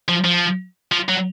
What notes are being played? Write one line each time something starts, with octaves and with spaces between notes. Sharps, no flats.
F3
F3
F3
F#3